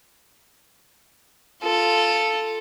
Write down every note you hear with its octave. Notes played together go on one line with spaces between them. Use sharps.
F4 A4